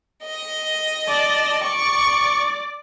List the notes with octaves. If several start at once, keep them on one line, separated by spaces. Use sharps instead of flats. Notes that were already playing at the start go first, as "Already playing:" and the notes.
D#5
D5 A5
D5 C#6 D6